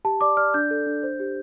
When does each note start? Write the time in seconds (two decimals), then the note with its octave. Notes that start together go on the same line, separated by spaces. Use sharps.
0.05 G4 A5
0.21 D5 D6
0.37 D5 F6
0.54 D4 G6
0.71 A4
0.87 D4
1.03 C5
1.20 G4